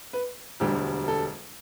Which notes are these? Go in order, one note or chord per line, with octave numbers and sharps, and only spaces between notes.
B4
E1 D2 D3 G3 G4
A4